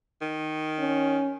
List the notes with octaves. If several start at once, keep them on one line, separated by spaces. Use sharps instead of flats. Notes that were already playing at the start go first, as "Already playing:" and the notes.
D#3
C#4